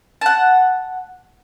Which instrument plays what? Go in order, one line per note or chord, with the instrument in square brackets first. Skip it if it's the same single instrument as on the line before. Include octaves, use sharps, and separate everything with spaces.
[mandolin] F#5 A5